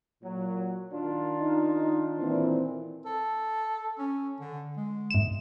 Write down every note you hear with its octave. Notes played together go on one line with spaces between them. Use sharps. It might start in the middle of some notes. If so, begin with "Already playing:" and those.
A#2 F#3
D#3 D4 F4
D#4
A#2 E3 C4
A4
C#4
D3
G#3
G#2 E7